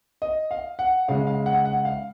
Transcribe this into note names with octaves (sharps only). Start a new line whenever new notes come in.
D#5
F5
F#5
C#3 G#3 F5
F5
F#5
F#5
F5